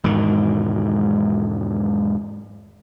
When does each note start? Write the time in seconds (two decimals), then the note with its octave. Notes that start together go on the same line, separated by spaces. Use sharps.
0.04 E1 G#2 B2 D#3